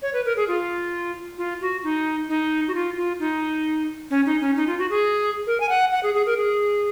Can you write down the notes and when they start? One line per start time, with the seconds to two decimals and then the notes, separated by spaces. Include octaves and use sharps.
0.02 C#5
0.13 B4
0.25 A#4
0.37 G#4
0.48 F4
1.38 F4
1.61 F#4
1.84 D#4
2.29 D#4
2.68 F#4
2.75 F4
2.97 F4
3.19 D#4
4.10 C#4
4.26 D#4
4.41 C#4
4.56 D#4
4.67 F4
4.79 F#4
4.90 G#4
5.47 A#4
5.60 G#5
5.69 F#5
5.92 F#5
6.03 G#4
6.14 G#4
6.26 A#4
6.38 G#4